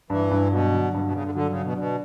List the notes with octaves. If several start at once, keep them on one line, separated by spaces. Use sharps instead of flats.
G2 E3
G2
B2 F#3
D3
G2 B2
B2
G2 C#3
D3
D3 F#3
C#3
D3
B2
B2 D4